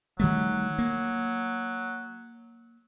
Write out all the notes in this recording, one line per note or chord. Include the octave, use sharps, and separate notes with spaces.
D#3 F#3 G3 A3
A#3